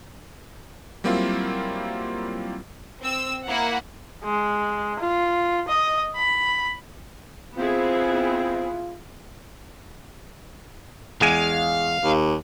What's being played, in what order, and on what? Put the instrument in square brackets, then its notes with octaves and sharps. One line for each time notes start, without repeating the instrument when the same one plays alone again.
[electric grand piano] F#3 G3 A#3 C4 E4 F4
[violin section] C4 E6
A#3 E4 F#5
[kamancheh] G#3
F4
D#5
B5
[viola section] B3 E4 G#4 [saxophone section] C4 [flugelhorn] F4
[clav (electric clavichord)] E2 G#3 G#5 [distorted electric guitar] F5
[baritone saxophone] D#2